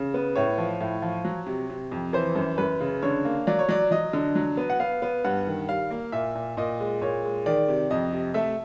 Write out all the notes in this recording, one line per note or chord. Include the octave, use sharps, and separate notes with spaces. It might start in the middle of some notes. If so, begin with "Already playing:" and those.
Already playing: C#3
B3
A2 C#5
F3
A2
F3
F#3
C3
C3
F2
E3 C5
F#2
F#2 B4
C#3
D3 C#5
A#3
F#3 D5
C#5
F#3 D5
F#3 D#5
D3
F#3
B3
F#5
B3 F5
B3
G2 F#5
D#3
G3 F5
A#3
A#2 E5
A#2
A#2 D#5
G#3
A#2 C#5
G#3
D#3 D5
C3
F2 D#5
C3
A3 E5